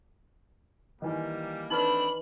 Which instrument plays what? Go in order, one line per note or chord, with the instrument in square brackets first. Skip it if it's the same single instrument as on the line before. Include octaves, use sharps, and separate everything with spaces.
[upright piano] D#3 E3 G#5 [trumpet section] G3 A#3
[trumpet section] A3 C4 D4 [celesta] D#4 B4 F6 [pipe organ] B5